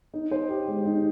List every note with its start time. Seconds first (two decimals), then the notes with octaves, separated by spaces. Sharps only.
0.14 D#4
0.31 C5
0.49 G4
0.68 G#3
0.85 D#4